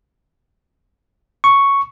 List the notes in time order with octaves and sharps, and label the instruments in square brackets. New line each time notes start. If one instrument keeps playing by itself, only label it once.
[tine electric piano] C#6